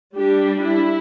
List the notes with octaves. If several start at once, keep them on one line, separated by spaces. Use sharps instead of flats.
G3 D4 G4
E4